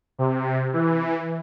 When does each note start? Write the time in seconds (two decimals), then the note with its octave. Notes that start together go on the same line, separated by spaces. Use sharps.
0.19 C3
0.73 E3